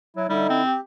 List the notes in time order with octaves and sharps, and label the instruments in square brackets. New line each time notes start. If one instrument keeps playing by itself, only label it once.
[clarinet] F#3 [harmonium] E4
[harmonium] D3 D#4 E4 [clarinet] G3
[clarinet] C4
[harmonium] G4